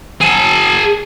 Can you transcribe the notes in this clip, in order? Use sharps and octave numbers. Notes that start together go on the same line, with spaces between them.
G#4 A5